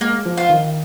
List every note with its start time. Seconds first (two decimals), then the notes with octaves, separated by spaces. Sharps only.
0.01 G#3 A#3
0.26 F3
0.37 F4 C5 F5
0.50 D#3